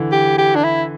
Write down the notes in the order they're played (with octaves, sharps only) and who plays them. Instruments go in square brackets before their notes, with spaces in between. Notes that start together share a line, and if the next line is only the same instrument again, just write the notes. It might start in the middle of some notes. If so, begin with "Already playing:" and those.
Already playing: [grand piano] D3 E3
[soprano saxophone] G4
G4
D4
E4